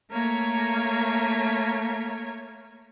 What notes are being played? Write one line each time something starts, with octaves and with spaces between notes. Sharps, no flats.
A3 A#3 C#5 G#6